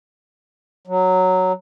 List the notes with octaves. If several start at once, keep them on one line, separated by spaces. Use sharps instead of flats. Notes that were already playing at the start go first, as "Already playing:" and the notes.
F#3